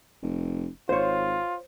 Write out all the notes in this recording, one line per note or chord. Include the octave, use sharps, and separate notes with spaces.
F1
G#1 F4 C5 C#5